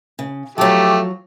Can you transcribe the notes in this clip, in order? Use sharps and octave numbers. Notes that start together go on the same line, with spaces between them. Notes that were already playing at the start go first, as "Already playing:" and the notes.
C#3
F3 F#3 A3 G4